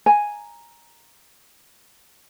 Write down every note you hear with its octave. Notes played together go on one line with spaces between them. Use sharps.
G#5 A#5